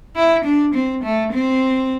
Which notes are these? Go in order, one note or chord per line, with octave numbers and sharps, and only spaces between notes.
E4
D4
C4
A3
C4